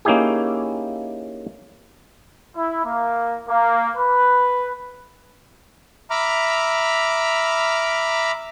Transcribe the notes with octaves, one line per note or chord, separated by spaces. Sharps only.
A#3 C#4 D#4 E4 G4 G#4
E4
A#3
A#3
B4
E5 A#5 B5 D6 F6